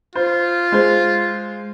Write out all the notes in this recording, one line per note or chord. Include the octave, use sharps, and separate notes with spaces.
F4 C5
G#3 C5